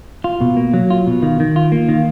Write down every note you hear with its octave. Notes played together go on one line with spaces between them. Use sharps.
F4
B2
A#3
F#3
F4
B2
D#3
D#3
F4
A#3
D#3